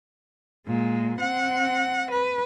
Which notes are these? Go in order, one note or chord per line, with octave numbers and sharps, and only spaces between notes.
A#2 G#3
C4 F#5
B4